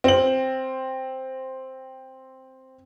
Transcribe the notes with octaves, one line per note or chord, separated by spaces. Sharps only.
C4 F#7